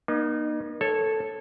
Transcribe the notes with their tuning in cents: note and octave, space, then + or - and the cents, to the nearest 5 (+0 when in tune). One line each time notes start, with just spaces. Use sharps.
A#3 +40 D#4 -30
A4 +0 C#5 -15